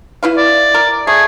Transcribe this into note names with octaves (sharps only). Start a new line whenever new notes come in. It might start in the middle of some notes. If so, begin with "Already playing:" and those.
E4 B4 F5
D5
A#4
A3 G#4